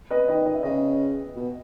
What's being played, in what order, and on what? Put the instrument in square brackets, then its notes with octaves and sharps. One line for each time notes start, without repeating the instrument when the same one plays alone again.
[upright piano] B4 D#5
[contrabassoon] D#3 [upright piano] D#5 G5
[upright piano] D#5
E5
[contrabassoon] C#3 [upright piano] B4 D#5
[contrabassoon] B2